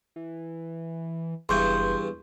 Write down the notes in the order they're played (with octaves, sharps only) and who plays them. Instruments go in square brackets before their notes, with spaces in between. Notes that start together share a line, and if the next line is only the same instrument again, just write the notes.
[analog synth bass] E3
[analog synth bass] F#1 [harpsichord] E2 G2 [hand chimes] C6 C#6 G6